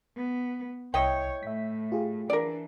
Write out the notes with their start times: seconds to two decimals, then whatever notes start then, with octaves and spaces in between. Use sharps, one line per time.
0.17 B3
0.94 C2 E4 C#5 D#5 G5
1.43 A2 E5 B6
1.92 F4 G4 G#4
2.30 E3 D4 A#4 D5